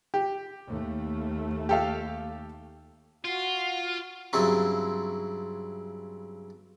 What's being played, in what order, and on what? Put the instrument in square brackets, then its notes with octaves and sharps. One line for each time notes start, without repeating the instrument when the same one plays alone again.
[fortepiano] G4
[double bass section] D#2 A3
[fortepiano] G4 A4 F5
[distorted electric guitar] F4 [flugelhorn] F#4
[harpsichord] G2 C#3 F#3 C4 E4 C#6